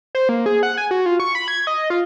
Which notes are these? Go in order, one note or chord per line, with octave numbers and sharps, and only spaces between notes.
C5
A#3
G#4
F#5
G#5
F#4
F4
C#6
B5
G#6
D#5
F4